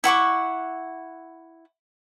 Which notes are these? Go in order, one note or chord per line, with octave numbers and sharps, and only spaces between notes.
E4 F#5 C#6 D6